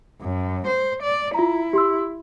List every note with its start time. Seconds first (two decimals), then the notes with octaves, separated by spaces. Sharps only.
0.21 F#2
0.67 C5
1.02 D5
1.34 E4 F4 A#5
1.73 G4 C6 E6